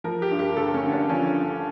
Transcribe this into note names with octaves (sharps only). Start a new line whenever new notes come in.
F3 A#4
G4
G2
G4
A#4
G1 A4
C#4
D3
D4
F3 C#4